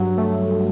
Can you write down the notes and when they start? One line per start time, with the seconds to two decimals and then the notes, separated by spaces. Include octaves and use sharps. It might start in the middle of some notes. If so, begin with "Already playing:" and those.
Already playing: G2 F#3
0.17 A3